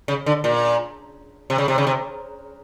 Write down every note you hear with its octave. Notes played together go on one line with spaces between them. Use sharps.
C#3
D3
A#2
C3
C#3
C3
C#3
C3